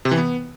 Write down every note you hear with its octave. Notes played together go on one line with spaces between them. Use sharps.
C3
E3
B3